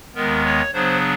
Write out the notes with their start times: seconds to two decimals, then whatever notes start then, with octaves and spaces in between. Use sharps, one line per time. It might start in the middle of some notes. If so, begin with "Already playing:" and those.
0.15 D#2 D#3 G#3 B3 A#4
0.44 C#5
0.73 C#3 F#3 B3 D4 C5